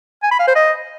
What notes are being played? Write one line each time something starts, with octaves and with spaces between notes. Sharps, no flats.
G#5
B5
F5
C5
D#5